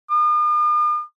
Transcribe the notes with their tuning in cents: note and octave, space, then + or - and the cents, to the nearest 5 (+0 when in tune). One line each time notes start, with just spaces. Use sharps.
D#6 -45